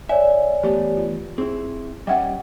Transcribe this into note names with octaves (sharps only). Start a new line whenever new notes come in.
C#5 D5 E5 G#5
E3 A3 B3 G4
F4
C4 E4 G#4
G3 C#4 D#5 E5 F#5 G5